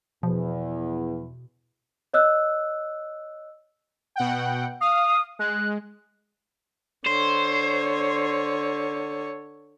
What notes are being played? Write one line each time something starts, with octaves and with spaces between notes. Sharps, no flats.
E2 B2 F3
C#5 D#5 E6 F#6
B2 F#5 G5
F5 D#6
G#3 F#6
D3 C5 C#5